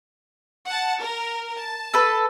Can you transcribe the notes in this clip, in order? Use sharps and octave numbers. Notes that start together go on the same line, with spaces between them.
F#5 A5
A#4
A5
A4 B4